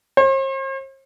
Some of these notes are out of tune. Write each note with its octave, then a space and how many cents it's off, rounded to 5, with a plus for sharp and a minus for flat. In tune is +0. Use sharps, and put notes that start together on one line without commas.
C5 +45